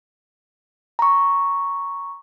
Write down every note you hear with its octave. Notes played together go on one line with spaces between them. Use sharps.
A#5 C#6